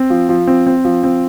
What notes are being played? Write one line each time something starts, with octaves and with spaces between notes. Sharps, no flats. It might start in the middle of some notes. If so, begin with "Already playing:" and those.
Already playing: C4
F3
F3
C4
C4
F3
C4